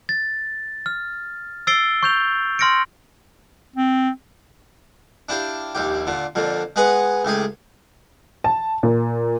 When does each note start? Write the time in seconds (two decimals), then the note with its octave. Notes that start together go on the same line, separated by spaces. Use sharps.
0.09 A6
0.86 F6
1.67 E6 A6 C7 D7 G7
2.03 C#6 G6 F7
2.59 C6 F6 A#6 C#7 D7
3.76 C4
5.29 D4 E4 G4 F5
5.75 A#1 D#2 G4
6.07 A#2 D3
6.35 F2 A#2 D3
6.76 G#3 B3 G#4 B4 F#5
7.25 C#2 A2 G4 G#4
8.44 A5
8.83 A#2